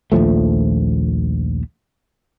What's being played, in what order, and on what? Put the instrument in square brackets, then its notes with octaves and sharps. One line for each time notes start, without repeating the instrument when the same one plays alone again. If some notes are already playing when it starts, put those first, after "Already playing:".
[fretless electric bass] A#1 D#2 F3 A3